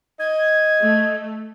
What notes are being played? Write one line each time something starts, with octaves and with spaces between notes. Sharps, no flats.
D#5 G#6
A3